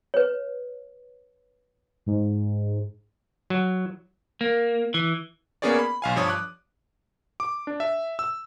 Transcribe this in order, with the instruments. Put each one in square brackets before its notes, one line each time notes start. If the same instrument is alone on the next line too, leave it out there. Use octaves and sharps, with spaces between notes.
[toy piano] B4 C#5
[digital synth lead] G#2
[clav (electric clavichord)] F#3
[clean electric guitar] A#3
E3
[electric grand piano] A#3 B3 C#4 G#4 C#5 D5
B5
B1 F5 G#5
G2 F3 C#5 D#6
D6 F#6
D6
D4
E5
E6